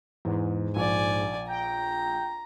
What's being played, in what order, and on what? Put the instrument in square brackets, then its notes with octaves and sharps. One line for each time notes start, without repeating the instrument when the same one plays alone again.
[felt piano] E2 [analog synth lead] G#2
[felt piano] A#1 [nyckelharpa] D5 G#5
[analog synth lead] G5 [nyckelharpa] A#5